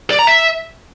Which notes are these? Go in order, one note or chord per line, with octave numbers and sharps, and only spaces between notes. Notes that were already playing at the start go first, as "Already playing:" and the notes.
D5
A#5
E5